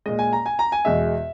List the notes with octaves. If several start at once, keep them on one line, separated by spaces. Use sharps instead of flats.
A#2 G#3 D#5
G#5
A#5
G#5
A#5
G#5
E2 B2 G#3 E5